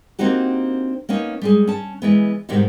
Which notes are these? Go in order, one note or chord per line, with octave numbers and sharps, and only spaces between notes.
A#3 C4 D4 D#4 F#4 G4
A#3 B3 C#4 D#4
G3 G#3 G#4
C#4 A5
E3 G#3 B3
G#2 B2 D#3 G3 G#3 D#4